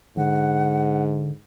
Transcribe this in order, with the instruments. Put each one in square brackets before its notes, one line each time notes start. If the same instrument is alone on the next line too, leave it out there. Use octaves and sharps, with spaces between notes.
[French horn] G#2 [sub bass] D3 [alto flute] F#5